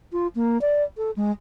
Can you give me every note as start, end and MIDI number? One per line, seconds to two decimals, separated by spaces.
0.12 0.27 65
0.35 0.60 58
0.61 0.83 74
0.97 1.11 69
1.16 1.31 56